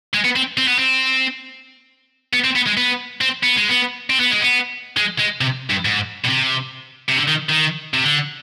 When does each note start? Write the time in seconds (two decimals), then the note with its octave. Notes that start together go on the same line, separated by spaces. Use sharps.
0.14 G#3
0.24 B3
0.36 C4
0.57 C4
0.68 B3
0.79 C4
2.33 B3
2.44 C4
2.55 B3
2.66 G#3
2.77 B3
3.21 C4
3.43 B3
3.56 G#3
3.69 B3
4.10 C4
4.20 B3
4.31 G#3
4.41 B3
4.97 G#3
5.19 G#3
5.41 C3
5.70 G2
5.85 G#2
6.24 B2
6.28 C3
7.08 C3
7.17 D3
7.28 D#3
7.49 D#3
7.94 C3
8.04 D3